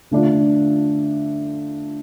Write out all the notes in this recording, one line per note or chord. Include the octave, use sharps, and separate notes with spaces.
D3 A3 D4 F4